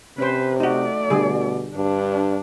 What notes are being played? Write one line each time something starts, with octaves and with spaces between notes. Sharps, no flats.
C3 C#4 B4 C5
A3 D#4 F#4 D5
B2 D3 G3 G#4
G2 D4